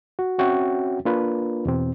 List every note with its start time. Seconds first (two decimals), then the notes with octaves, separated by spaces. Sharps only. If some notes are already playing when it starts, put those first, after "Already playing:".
0.19 F#4
0.38 C4 C#4 F#4 C#5 E5 G5
1.05 A#3 D4 F4 A#4 B4
1.65 E2 B2 C4